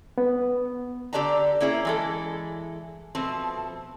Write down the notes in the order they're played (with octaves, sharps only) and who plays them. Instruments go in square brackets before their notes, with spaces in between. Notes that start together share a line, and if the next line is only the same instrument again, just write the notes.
[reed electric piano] B3
[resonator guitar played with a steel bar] D3 G4 B4 D5 A5 A#5
A#3 C#4 E4 G#4
E3 G#3 A4
B2 F3 A3 C4